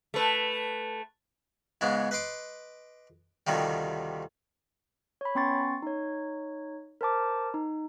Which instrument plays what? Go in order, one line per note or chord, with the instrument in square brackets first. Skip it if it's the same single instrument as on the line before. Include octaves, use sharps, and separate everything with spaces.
[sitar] A3 B4
[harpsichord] G#2 C#3 G#3 B3
B4 D#5 C6 D6
D2 C3 D#3 F3 G3
[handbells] C#5 B5
B3 C#4 G5 C6 C#6 A6
D#4 C#5
A#4 C5 A5 D6
D#4